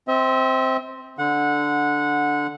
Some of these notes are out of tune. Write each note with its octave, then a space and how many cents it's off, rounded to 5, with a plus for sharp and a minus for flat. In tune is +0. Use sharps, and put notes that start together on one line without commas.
C4 +0 E5 -45
D3 +0 F#5 -20